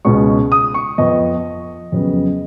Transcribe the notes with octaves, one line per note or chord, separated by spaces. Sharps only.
C#2 B2 G#3 C#4 C#6
D#6
C#6
F2 F3 B3 D#5
F2 C#3 F#3 B3